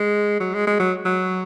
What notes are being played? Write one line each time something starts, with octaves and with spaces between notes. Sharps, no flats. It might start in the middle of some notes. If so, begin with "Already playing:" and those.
Already playing: G#3
F#3
G#3
G#3
F#3
F#3